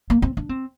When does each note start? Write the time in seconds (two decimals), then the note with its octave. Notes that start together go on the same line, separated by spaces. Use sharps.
0.10 A#3
0.22 C4
0.37 D4
0.49 C4